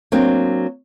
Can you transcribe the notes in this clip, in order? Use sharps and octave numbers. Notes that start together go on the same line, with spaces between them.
F#3 A#3 C4 D4